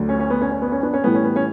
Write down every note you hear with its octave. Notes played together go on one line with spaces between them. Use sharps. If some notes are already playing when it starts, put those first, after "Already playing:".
Already playing: D2 D3 F#3
C#4
C#4
B3
C#4
C#4
B3
C#4
B3 D4
C#4
A2 E3 G3 B3
C#4
B3
C#4